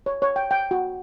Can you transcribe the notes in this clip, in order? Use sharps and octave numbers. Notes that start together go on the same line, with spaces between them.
C#5
C#5
G5
G5
F#4